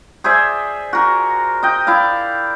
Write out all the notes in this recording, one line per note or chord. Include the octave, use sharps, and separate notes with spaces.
G#4 C5 D5 E5
F#4 A#4
D#5 G5
E4 D5 F5